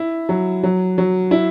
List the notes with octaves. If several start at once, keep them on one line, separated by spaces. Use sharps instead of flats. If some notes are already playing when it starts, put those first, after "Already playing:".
Already playing: E4
F#3
F#3
F#3
E4